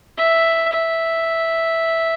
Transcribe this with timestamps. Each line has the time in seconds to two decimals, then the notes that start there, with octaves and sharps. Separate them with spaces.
0.18 E5
0.73 E5